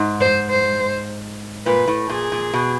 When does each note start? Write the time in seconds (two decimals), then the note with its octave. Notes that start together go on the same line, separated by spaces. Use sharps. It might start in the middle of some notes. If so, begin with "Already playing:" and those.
Already playing: G#2
0.21 C5
0.50 C5
1.66 A#2 B4
1.88 A2
2.09 A#2 G#4
2.32 A#2
2.54 B2